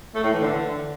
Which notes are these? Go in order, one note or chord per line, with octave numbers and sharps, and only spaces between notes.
A3
A2
E3
D3